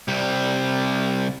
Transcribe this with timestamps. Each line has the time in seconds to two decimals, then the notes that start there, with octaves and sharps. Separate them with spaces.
0.08 C2 G3